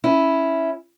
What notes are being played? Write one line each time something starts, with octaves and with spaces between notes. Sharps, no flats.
C#4 E4